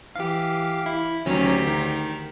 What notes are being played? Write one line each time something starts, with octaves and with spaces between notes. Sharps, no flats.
E3 G4 F5
E4
D2 D#3 F#3 C#4 G4 A#5
D#3